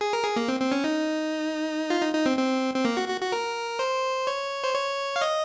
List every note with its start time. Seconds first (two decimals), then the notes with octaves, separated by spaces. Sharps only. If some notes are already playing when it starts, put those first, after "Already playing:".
0.01 G#4
0.13 A#4
0.24 G#4
0.36 A#3
0.48 C4
0.60 C4
0.72 C#4
0.84 D#4
1.90 F4
2.02 D#4
2.14 D#4
2.26 C4
2.38 C4
2.74 C4
2.85 A#3
2.97 F#4
3.08 F#4
3.21 F#4
3.32 A#4
3.79 C5
4.27 C#5
4.64 C5
4.74 C#5
5.16 F5
5.21 D#5